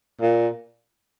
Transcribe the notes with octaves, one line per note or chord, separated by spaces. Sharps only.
A#2